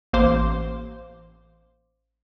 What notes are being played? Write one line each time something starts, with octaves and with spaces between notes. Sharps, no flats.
A1 A#3 C5 F5 C6 D6